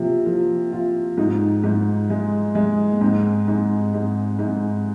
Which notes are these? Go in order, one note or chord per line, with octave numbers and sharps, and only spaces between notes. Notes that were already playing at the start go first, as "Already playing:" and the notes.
Already playing: C3 F3 A#3
F3
F4
G#2 D#4
G#2
G#3
G#3
A#3
G#2 C4
G#2
G#2
G#2